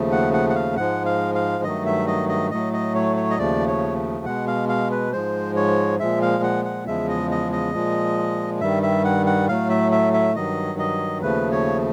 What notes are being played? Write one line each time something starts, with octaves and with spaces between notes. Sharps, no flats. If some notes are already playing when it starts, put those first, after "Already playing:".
Already playing: D#2 C#3 F3 A3
F#5
F#5
F#5
F5
G#2 F3 G#3 F#5
F5
F5
G2 D#3 F#3 A3 D#5
E5
D#5
D#5
A2 F#3 A3 D#5
D#5
C#5
C#5
D#5
D#2 C#3 F3 A3 D5
C#5
B2 G#3 F#5
F5
F5
B4
G#2 F3 G#3 C5
C#5
A#2 F3 G#3 E5
F5
F#5
F#5
E2 C#3 F3 G#3 E5
D#5
D#5
D#5
A#2 F3 G#3
G2 D#3 G3 E5
E5
F#5
F#5
A2 F#3 A3 F5
E5
E5
E5
G2 D#3 F#3 D#5
D#5
D#2 C#3 F3 A3 B4
C#5